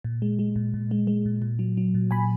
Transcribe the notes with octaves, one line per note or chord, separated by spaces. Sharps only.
A#2
G#3
G#3
A#2
A#2
G#3
G#3
A#2
A#2
F#3
F#3
A#2
A#2 G#5 B5